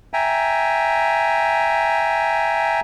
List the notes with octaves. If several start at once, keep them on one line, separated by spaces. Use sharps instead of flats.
E5 G5 G#5 A#5